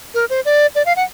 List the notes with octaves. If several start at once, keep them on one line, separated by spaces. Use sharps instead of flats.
A#4
C5
D5
D5
F5
F#5